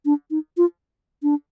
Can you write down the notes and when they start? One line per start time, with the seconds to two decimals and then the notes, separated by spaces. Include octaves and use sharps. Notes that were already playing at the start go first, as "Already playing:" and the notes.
0.05 D4
0.31 D#4
0.57 F4
1.23 D4